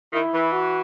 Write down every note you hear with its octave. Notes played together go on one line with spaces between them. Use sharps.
D#3 E4
E3
F#4